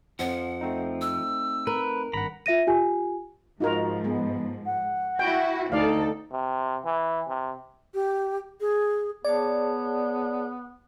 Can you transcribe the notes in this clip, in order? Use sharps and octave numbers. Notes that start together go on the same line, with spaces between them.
F2 F3 F#5
A3 C4 D#4
E6
A#4 B4
G#1 G2 F#5 A#5 B5
F4 E5 A#6 D#7
F4 G4 G#5
G#2 F3 D#4 F4 F#4 A#4
G#3 B3
F#5
E4 F#4 G5
D2 D#4 A4 D5 F5
C3
E3
C3
G4
G#4
B3 G#4 C#5 D5 A5